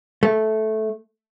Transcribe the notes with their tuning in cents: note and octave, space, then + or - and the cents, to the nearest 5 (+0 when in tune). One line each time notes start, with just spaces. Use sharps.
A3 -10